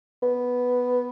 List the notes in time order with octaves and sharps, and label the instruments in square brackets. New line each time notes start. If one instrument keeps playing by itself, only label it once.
[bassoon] B3